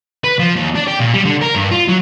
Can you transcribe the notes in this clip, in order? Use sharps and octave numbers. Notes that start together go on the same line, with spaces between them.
B4
F3
D#2
D4
G4
A#2
G3
D3
A#4
G2
F4
F#3